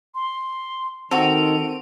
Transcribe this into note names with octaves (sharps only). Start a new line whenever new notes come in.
C6
D#3 C4 F#4 A4 D7 D#7 F7